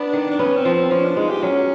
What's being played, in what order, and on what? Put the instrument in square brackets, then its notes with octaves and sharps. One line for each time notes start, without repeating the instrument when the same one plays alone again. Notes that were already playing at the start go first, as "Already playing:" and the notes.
Already playing: [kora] B3 [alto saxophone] D4
[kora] D#3
[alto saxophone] D4
[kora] B3 [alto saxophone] C#4
[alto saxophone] C4
[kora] F3
[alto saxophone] C4
[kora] F3 [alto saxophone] C#4
[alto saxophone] D4
[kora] G#3 [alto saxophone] D#4
[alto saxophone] G4
[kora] F#3 [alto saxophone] C#4